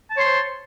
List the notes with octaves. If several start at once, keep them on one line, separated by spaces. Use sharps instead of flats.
C5 C#5 A5 C6